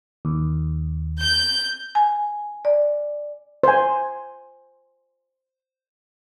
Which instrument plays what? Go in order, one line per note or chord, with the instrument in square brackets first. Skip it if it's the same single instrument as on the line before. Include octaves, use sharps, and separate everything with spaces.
[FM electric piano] D#2
[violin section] G6
[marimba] G#5
D5
[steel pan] C5 G#5